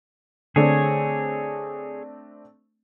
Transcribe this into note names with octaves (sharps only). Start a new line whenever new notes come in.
D3 A3 C4 D4 G#4 C#5